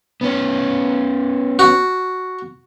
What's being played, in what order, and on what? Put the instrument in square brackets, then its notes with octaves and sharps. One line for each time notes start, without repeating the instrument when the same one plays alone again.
[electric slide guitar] B3 C#4
[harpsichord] F#4